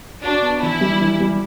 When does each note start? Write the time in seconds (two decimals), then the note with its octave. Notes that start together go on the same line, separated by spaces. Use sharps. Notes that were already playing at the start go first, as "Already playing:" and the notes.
0.24 D4 F#4
0.42 B3
0.62 E3 E4
0.81 G3
1.01 E3
1.20 G3